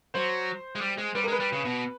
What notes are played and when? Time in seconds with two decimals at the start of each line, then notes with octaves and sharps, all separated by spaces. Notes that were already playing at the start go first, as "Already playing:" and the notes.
0.14 F#3 C5
0.75 G#3
0.81 G3
0.98 G#3
1.15 G3 B4
1.23 A#4
1.28 G#3
1.32 B4
1.40 G3
1.53 C#3
1.65 B2